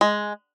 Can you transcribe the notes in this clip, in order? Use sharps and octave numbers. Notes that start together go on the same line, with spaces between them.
G#3